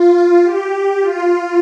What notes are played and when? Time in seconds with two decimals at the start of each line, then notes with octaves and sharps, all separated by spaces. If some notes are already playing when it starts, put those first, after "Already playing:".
Already playing: F4
0.15 F4
0.43 G4
1.00 F4
1.29 F4